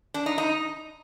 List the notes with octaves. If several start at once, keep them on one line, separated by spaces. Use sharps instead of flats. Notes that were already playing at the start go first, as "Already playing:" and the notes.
D4
D#4
D#4